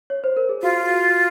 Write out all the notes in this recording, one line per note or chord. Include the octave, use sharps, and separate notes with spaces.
C#5
C5
A#4
G#4
F4 F#4